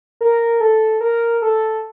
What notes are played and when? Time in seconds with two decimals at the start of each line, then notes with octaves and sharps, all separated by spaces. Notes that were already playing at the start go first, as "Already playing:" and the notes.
0.21 A#4
0.60 A4
1.01 A#4
1.42 A4